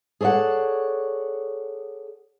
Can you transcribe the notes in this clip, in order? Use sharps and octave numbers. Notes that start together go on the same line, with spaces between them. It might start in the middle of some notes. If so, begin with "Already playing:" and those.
G#4 A4 C#5 D5 F#5